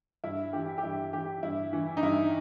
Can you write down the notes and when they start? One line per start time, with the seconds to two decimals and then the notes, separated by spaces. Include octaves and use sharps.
0.24 G2 E4
0.53 E3 G4
0.78 G4
0.83 G2 E4
1.13 E3 G4
1.43 G2 E4
1.73 E3
1.97 D#4
2.03 G2 E4